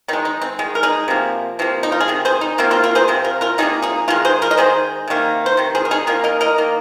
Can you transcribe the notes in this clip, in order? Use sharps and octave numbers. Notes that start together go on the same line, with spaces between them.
D#3 G#3 D#4
D#4
C4
D#3 G#3
A#4
D#4 G#4
C3 F3 A#3
C3 F3 A#3
D#4
F4
G#4
C3 D#3
G#4 C5
D#4
C3 D#3 A#3 C4 F4
C4 F4
F4 A#4
G#4 C5
C3 F3
F4 A#4
F4 A#4
C3 F3 A#3 D#4 G#4
D#4 G#4
D#3 G#3 F4 A#4
G#4 C5
F4 A#4
D#5
D#3 G#3 G#4 C5
C3 D#3 A#3
C5
C3 D#3
G#4 C5
A#4
D#4 G#4
D#3 A#3 F4 A#4
A#4 D#5
A#4 D#5
D#3 A#3